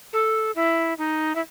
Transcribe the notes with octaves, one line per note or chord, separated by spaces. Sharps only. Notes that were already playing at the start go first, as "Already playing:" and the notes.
A4
E4
D#4
E4